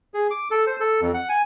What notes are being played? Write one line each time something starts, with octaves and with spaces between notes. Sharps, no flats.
G#4
D6
A4
C5
A4
F2
F#5
G#5